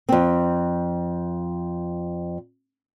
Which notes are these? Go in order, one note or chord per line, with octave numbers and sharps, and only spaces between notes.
F2 C4